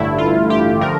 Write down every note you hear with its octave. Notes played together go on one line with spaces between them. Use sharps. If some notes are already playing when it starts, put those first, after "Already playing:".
Already playing: A1 G2 D3 A3 E4
F4
G4
D3 F3 A3 A#4